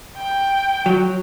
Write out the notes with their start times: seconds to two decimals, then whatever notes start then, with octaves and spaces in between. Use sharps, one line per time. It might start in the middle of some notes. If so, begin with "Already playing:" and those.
0.17 G5
0.86 F#3